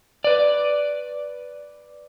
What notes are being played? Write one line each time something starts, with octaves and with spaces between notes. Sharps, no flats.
B4 D5